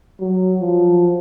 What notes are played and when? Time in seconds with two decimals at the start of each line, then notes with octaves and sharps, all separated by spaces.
0.20 F#3
0.60 F3